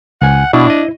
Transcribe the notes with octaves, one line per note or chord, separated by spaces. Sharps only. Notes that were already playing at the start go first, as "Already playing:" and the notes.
C#2 F#5 G#5
B2 D4 E4
D#5